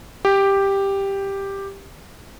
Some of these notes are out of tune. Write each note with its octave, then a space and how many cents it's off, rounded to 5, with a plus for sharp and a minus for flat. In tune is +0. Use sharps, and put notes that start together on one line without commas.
G4 +5